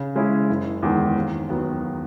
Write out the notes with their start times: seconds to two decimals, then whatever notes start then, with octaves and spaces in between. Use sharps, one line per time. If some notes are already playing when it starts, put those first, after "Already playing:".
Already playing: C#3
0.15 G#3 C#4 E4
0.49 F#1
0.83 E2 D#3 G#3
1.16 D#2
1.49 D#3 F#3 B3